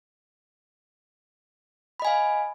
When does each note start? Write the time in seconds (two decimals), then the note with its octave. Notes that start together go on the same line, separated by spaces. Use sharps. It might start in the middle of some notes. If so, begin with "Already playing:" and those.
2.00 B5
2.02 D#5
2.05 G#5
2.07 F5